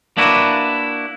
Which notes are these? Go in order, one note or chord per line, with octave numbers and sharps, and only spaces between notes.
A#3 D4 E4 F#4 B4